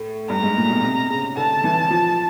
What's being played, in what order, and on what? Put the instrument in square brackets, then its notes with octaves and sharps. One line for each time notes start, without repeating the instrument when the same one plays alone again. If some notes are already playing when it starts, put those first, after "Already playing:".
Already playing: [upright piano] A2
[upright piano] G2 [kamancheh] A#5
[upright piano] G#2
A#2
B2
C3
C#3
[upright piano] D3 [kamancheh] A5
[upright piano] E3
F3